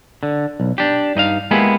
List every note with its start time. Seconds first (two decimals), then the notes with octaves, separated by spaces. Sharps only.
0.23 D3
0.60 B1
0.78 D4 G4
1.15 G2 D#4 D#5 F5
1.51 G#3 A#3 B3 E4 G4 G#4